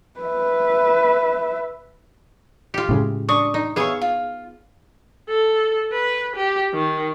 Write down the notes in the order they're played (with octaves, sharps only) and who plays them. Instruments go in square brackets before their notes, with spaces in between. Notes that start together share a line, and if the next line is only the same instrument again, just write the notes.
[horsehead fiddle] B4 E5
[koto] F4 G4
[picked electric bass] A2 C#3 G#3
[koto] D4 [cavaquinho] C#6 D#6
[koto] D#4
[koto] B3 G#4 [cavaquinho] C#5 E5 F5
[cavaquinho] F4
[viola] A4
B4
G4
D#3